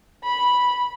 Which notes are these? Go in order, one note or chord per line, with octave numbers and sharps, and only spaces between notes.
B5